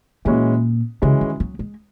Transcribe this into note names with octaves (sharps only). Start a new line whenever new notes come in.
A#2 E3 G#3 C#4 F#4
C#3 E3 G#3 C#4 F#4
D#3
F#3
G#3